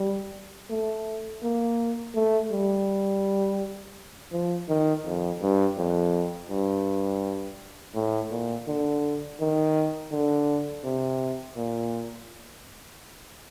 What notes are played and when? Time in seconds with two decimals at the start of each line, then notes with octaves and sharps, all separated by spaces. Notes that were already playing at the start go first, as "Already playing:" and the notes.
Already playing: G3
0.70 A3
1.43 A#3
2.15 A3
2.52 G3
4.32 F3
4.68 D#3
5.05 F2
5.42 G2
5.77 F2
6.50 G2
7.95 A2
8.30 A#2
8.67 D3
9.40 D#3
10.11 D3
10.84 C3
11.56 A#2